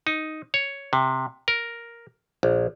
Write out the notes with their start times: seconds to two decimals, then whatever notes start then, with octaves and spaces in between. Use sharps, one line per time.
0.07 D#4
0.54 C#5
0.93 C3
1.48 A#4
2.43 A#1